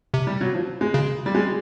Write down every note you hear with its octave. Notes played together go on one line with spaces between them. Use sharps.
C3
G3
F#3
F3
G#3
C#3
G3
G#3